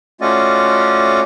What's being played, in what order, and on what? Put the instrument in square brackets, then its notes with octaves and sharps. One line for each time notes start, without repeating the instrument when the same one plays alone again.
[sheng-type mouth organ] A3 C#4 F4 F#4 D5 D#5